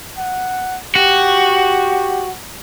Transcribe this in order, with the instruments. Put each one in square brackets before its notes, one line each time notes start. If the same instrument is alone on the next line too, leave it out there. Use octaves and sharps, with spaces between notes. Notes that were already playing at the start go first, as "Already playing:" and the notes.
[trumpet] F#5
[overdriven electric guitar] F#4 [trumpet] G4